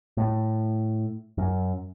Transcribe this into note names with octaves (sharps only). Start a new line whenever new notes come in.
A2
F#2